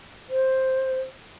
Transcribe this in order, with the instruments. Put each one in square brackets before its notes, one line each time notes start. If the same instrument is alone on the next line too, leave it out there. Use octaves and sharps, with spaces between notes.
[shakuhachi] C5